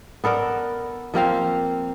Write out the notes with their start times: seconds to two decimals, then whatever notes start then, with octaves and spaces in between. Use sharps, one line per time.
0.24 B3 A4 A#4 D5
1.14 F3 A#3 C4 F5